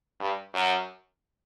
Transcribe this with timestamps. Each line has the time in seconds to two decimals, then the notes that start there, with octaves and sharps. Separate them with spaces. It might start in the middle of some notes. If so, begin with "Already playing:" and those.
0.20 G2
0.54 F#2